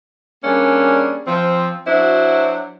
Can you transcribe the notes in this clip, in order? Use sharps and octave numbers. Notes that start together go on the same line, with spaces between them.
G3 A#3 C#4 D4 G#4
F3 C4
F#3 D4 E4 F#4 C5